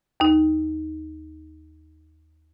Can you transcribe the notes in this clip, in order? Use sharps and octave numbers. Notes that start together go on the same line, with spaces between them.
D#2 D#4